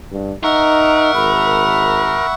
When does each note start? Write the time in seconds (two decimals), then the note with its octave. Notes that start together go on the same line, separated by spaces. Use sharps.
0.12 G2
0.44 D#4 A#4 E5 F#5 C#6
1.14 G#1 B5